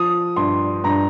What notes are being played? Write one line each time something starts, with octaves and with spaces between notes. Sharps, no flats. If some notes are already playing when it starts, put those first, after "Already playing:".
Already playing: F3 D#6
G2 C6
G2 A#5